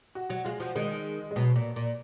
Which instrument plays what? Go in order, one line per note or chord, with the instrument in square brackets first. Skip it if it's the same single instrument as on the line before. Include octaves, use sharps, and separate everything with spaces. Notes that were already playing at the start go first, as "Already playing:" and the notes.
[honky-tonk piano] F#4
[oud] F#3 [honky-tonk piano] F#4
[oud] G#3 [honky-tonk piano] F4
[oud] F3 [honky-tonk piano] F#4
[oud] D#3 [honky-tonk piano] G#3
[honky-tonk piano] G#3
[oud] B2 [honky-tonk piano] F#3
[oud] A#2
A#2